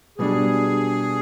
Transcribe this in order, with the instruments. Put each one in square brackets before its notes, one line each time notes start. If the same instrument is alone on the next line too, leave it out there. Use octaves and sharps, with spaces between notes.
[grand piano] B2 G3 D4 [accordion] G#4